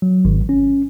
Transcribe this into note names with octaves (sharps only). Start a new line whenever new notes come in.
F#3
G#1
C#4